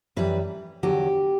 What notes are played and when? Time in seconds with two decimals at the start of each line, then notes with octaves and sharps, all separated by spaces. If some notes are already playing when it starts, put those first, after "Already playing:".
0.16 F#2 E3 G3 B4
0.83 E2 D3 F#3 G4